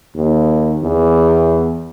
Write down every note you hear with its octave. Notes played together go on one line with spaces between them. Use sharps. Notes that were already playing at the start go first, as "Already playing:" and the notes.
D#2
E2